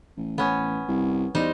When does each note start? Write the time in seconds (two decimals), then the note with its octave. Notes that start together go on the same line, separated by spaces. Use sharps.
0.17 A1
0.38 B3 C#4
0.88 C2
1.35 E2 G3 D#4 C5